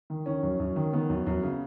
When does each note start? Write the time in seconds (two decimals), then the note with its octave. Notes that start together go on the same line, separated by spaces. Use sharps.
0.10 D#3
0.26 D#3 C#4
0.43 F#2
0.60 F#2
0.76 D#3
0.93 D#3 B3
1.10 F#2
1.27 F#2
1.43 C#3